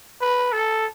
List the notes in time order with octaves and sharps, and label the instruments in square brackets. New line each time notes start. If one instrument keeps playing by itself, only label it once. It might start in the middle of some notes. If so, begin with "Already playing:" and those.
[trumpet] B4
A4